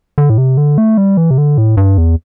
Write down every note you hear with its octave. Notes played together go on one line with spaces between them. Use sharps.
D3
A2
C3
D3
A3
G3
E3
C3
D3
A2
G2
E2